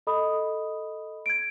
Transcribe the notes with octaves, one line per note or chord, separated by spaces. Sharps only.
A4 D#5 B5 D#6
G#6 D7